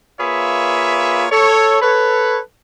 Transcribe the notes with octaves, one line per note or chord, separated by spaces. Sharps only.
A#3 F4 G#4 B4 C#5 E5
A4 C#5
A4 B4 C#5